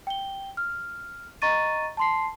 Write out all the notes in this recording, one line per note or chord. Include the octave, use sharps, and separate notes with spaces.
G5 G7
F6
D#5 A#5 C#6 A6 D#7
A5 C6 C7